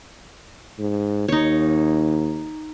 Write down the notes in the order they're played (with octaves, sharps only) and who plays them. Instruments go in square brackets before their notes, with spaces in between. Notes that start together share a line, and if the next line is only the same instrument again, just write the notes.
[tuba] G#2
[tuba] D#2 [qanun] D#4 C#5